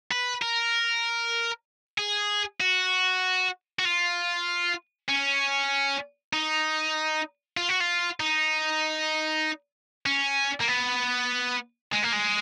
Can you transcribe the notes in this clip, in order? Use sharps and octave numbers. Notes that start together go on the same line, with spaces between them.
B4
A#4
G#4
F#4
F#4
F4
C#4
D#4
F4
F#4
F4
D#4
C#4
A#3
B3
G#3
A#3
G#3